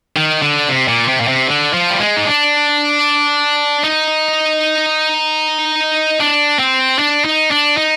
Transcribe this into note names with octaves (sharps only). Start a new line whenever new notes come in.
D#3
D3
C3
A#2
C3
A#2
C3
D3
F3
G3
G#3
D#4
D4
D#4
D4
C4
D4
D#4
D4
D#4